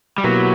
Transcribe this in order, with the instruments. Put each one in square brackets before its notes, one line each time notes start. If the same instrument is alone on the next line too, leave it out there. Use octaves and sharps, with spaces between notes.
[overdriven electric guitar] G3
[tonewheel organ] B2 A#3 E4 G4 B4 [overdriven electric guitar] F#3